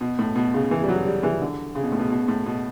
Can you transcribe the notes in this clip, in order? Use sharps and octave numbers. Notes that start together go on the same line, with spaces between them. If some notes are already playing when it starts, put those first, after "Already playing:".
B2
A2
B2
C#3
E3
G3
F#3
G3
E3
D3
C#3
B2
A2
B2
B2
A2
B2